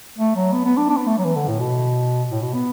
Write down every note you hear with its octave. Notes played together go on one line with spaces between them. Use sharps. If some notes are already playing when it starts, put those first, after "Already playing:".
A3
F#3
B3
B3
D4
D4
B3
A3
F#3
E3
D3
A2
B2
A2
B2
B3